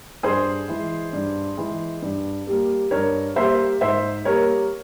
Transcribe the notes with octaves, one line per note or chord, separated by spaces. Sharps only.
G2 G#4 C5
E3 G#3
G2
E3 G#3
G2
G3 A#3
G2 A#4 C#5
G3 A#3 C5 E5
G#2 C5 E5
G3 A#3 A#4 C#5